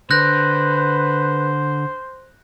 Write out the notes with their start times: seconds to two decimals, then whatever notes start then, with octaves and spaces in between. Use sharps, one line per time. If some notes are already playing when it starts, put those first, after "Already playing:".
0.11 D3 B4 C5 F#6 G6 A#6